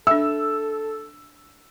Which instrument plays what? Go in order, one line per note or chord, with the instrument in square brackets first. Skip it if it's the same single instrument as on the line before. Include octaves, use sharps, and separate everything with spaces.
[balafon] D4 E5 [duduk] A4 [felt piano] E6